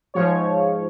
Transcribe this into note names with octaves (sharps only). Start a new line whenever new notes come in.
G#2 F3 C#5